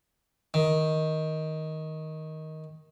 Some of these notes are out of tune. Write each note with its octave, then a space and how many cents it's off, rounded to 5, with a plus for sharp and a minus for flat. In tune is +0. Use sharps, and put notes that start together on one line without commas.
D#3 +10